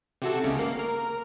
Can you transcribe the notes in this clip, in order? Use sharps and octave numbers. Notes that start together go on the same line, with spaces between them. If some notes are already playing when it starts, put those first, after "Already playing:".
C3 F#4 A4
G1 C#2 C#3
A#3
A#4